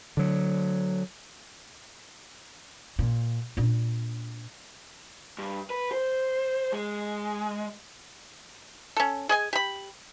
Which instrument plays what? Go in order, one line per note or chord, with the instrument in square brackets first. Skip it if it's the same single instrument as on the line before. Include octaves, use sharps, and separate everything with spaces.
[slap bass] D3 F#3
[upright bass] A#2
A#2 D4
[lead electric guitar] G2
B4
C5
G#3
[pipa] C#4 A4
G#4 D#5 G#5
G4 B5